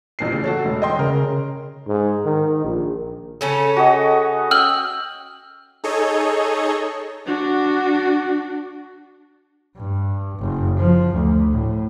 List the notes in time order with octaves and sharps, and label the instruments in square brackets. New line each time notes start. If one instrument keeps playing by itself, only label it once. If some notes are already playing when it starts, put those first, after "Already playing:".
[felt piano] A1 A#2 C7
C#3
F#4 A4 C#5
E1
D#5 G5 C6
[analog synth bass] C#3 [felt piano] A#4
[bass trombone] G#2
D#3
A#1
[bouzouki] C#3 C#4 A4
[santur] F#4 D#5
[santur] G5 [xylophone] E6 F6 F#7
[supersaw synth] D#4 G#4 A4 C#5 D#5
[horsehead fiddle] D4 F#4
[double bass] G2
F#1
F3
D2
A2